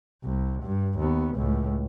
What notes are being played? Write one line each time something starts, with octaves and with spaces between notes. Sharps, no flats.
C2
G2
D#2 B3
C#2 A2